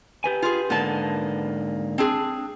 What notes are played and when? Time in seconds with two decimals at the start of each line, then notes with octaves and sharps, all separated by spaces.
0.24 G4 B4 G#5
0.42 F4 G#4
0.70 G#2 D3 A#3 B3 A5
1.98 C4 D4 G#4